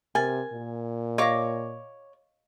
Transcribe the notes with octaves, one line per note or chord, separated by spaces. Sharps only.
C3 A#4 G#5 A6
A#2
C#5 D#5 F5 D6 A#6